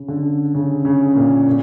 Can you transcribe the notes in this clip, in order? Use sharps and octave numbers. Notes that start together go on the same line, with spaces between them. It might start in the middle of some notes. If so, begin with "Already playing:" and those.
Already playing: C#3
D3
C#3
C#3
A#2
A#2